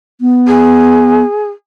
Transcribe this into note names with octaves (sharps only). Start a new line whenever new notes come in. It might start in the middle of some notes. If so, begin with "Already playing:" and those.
B3
G#4